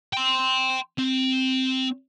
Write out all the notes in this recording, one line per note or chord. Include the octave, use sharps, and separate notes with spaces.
G5 C6
C4